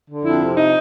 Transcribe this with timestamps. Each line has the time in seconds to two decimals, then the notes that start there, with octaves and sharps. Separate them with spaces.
0.09 D3
0.25 F2 E4
0.41 C3
0.57 D#4